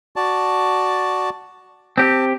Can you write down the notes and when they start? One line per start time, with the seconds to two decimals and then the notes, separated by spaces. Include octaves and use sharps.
0.16 F#4 D5 A5
1.98 C4 G4 A5